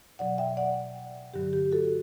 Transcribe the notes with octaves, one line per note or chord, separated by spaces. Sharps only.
B2 F#3 D5 F#5
E5 G5
D5 F#5
G2 D3 F#3 G4
G4
F#4 A4